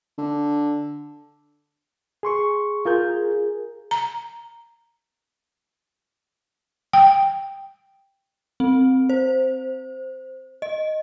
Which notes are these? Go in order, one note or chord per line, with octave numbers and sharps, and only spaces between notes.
D3
G#4 C6 C#6
F4 G#4 A#4 G6
A#5
G5
C4
C5
D#5